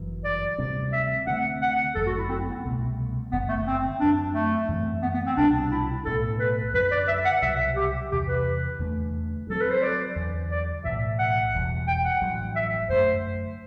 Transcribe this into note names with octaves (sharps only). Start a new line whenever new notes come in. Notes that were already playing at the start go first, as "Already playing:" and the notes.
Already playing: G1 F#2 E3
D5
D2 C3 G3 C4
E5
D2 D3 A3 C4 F#5
F#5
G1 F#2 F#3 A3 A4
F#4
E4
C4
B3
C2 B2 A3
F#1 F#2 D3 B3
A3
C4
F#2 F#3 C4 D4
A3
F#2 E3 A3 C4
B3
B3
C4
C2 B2 G3 D4
E4
B1 A2 G3 B3 A4
B4
F#2 D3 F#3 B4
D5
E5
F#5
C2 B2 F#3 E5
G4
E2 C3 E3 G4
B4
E2 D3 A3
G2
F#3 C4 A4
B4
C5
D5
E2 D3 F#3
D5
B1 A2 E3 E5
F#5
E1 E2 B2 G3
G5
F#5
A1 G2 F#3
E5
F#2 D3 A3 C5